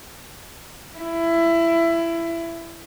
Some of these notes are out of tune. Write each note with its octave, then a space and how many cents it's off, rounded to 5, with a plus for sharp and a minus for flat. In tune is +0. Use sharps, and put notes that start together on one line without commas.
E4 +20